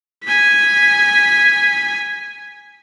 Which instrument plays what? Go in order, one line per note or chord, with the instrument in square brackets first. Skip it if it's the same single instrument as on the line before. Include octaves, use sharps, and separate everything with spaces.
[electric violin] G#5 B6